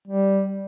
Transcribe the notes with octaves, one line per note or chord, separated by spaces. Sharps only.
G3